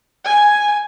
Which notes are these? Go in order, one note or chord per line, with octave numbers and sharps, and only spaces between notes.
G#5